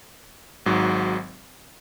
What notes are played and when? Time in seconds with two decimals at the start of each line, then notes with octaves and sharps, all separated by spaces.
0.66 G#1 G#2 F#3